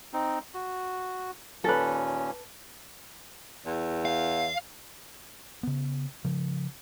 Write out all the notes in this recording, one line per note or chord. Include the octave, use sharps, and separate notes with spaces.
C4 D#4
F#4
D#2 A#2 C#4 A4 B4
E2
F5
C#3 B3
C#3 F3